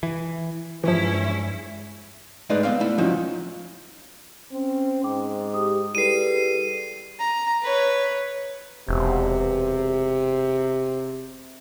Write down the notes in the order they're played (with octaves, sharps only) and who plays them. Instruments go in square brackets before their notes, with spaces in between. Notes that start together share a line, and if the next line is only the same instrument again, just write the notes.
[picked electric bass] E3
[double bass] G2 G#3 [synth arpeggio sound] E3 F3 [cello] C#4 E4
[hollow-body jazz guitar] G#2 G#3 A3 D#4 B4 D5
B3 C4 D5 F5
A3 E4
F3 F#3 C#4 D#4
[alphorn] C4 [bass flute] C#4
[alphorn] G#2 [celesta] G5 D6
[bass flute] G4 [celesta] D#6
[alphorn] G3 [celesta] E4 G#4 B4 [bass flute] A4 [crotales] C7 D#7
[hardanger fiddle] A#5
B4 C#5
[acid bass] E1 [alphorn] C3